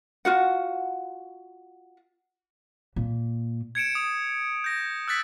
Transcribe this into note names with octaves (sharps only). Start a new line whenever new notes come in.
F4 F#4 F#5
A#2
G#6 C#7 D7 E7
D#6
G6 A#6
E6 F#6 A6 B6